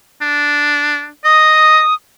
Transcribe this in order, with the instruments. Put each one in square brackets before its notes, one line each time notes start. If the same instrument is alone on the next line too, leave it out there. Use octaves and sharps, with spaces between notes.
[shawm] D4
[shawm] D#5 [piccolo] D#6